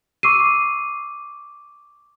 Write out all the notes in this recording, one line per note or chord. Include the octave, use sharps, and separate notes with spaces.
C#6 D6 E6 C7 D#7